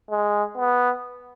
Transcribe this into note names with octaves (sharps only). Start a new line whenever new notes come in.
G#3
B3